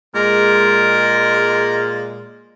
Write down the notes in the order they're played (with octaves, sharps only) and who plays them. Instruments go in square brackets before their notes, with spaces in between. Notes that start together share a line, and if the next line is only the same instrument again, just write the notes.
[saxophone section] A#2 G#3 [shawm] A#4